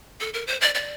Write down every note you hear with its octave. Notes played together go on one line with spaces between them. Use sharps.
A4
A#4
C5
D5
D5